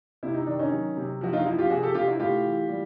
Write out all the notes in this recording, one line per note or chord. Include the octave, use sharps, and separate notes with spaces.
C3 E4
D#4
D#3 D4
C#4 D#4
F#3
C3
F3 F#4
D#4 F4
F3 E4 F#4
F4 G4
C3 F#4 G#4
G4 A4
C3 F4 G4
E4 F#4
A2 F4 G4
E3
G3